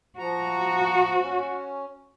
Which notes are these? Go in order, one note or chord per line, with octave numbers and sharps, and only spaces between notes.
F3 F#4 A#5
C#4